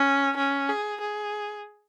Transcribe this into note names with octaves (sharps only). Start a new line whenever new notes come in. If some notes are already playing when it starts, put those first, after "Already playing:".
Already playing: C#4
C#4
G#4
G#4